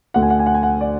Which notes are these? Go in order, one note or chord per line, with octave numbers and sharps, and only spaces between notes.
D2 D3 A3 F#5
G#5
F#5
G#5
F#5
G#5
F#5
D5